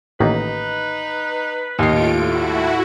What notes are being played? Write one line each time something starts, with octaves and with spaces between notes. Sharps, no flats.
A1 D#3 A#3 D#4 B4
D#2 A2 C#4 F4 D#5 C7 D7
G2 E4 F#4 A4